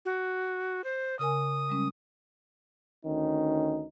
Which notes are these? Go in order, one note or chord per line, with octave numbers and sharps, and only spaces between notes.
F#4
C5
C#3 A#4 G#5 D#6
G3 G#3 C#4
D2 D#3 C#4 D#4